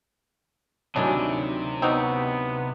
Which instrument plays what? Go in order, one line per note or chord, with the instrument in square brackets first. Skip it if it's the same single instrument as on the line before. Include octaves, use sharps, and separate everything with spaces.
[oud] D2 D#3 F#3 [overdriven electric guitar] C3 [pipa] E3 G#3 D4
[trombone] B3 [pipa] C4 D#4 F#4